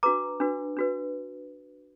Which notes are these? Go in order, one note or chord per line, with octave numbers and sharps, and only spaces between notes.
D4 F#4 B4 A#5 D6
D4 F#4 B4
D4 F#4 B4